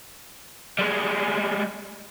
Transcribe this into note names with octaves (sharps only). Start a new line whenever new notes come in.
G3 G#3